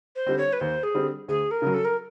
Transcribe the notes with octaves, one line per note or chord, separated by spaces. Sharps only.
C5
D3 G3 C4
C#5
B4
D#2 C5
G#4
D3 G3 C4
D2 G#4
A#4
C#3 F#3
A4
A#4